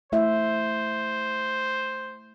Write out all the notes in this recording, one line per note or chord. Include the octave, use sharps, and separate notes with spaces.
A3 E4 C5 E5